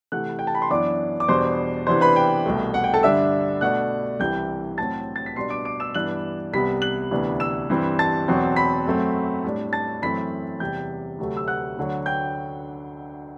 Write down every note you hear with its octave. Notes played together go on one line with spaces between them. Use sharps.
C3 E3 A3 F#5 F#6
G5
A5
B5
C6
F#2 E3 B3 D4 D5 D6
D6
E2 B2 G3 B3 D4 C5 C6
C3 E3 B3 D4 C5 C6
B4 B5
G5
C2 B2 A3
F#5
G5
A4 A5
G2 D3 G3 D4 E5 E6
B2 A3 D4 F#5 F#6
C2 C3 E3 G5 G6
A2 F#3 C4 A5 A6
A6
B6
B2 G3 D4 C6 C7
D6 D7
D6 D7
E6 E7
G2 E3 B3 D4 F#6 F#7
C2 C3 G3 B3 B5 B6
F#6 F#7
D2 C3 E3 B3 D4
E6 E7
G2 E3 G3 C4
A5 A6
E2 B2 F#3 C4
B5 B6
F#2 F#3 A3 C4
A2 G3 D4
A5 A6
F#2 E3 A3 C4 B5 B6
E2 C3 G3 G5 G6
D2 C3 F#3 A3
E6
F#5 F#6
D2 D3 F#3
G5 G6